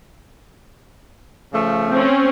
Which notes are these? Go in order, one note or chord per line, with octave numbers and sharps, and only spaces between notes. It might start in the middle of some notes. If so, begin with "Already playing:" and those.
C#3 F3 A3
C4 C#4